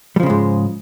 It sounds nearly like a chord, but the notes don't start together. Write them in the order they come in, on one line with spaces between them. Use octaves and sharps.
G3 F3 C#3 G#3 G#2